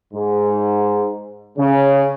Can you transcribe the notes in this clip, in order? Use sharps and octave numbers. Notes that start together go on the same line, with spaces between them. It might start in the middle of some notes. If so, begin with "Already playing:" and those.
G#2
C#3